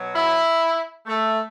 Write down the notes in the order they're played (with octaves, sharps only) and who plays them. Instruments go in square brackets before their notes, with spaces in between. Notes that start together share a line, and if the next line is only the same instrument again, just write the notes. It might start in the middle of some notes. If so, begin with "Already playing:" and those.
Already playing: [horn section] B2 F#3
E4
A3